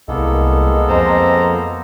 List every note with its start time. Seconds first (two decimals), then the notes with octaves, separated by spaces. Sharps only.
0.08 C2 G#3 A#3 B3 A4
0.89 F2 C5 A#5